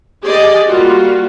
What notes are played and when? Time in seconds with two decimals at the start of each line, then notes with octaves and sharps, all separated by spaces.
0.23 G4 G#4 D5 D#5
0.67 G3 A#3 F4 F#4